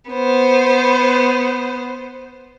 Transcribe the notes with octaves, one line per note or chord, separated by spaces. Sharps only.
B3 C5